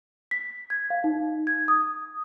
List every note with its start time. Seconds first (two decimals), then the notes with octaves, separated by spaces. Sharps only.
0.31 B6
0.70 G#6
0.90 F5
1.04 D#4
1.47 G#6
1.68 D#6